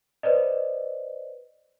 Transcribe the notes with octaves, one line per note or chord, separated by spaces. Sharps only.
B4 C5 D5 D#5